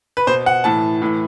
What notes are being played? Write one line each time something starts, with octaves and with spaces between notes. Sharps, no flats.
B4
B2 C5
F#5
A2 E3 A5
A2 E3